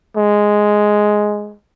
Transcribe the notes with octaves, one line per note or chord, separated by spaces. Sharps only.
G#3